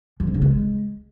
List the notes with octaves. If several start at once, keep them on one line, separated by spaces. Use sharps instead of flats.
F3
D4
C#3
G#3